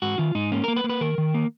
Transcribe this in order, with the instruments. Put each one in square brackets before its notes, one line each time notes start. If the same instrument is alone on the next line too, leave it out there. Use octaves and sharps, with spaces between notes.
[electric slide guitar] G#2 F#4
D#3 F4
G#2 D#4
A#3 C#4
A#3 A#4
B4
A#3
B4
D#3 A#4
D#3
A#3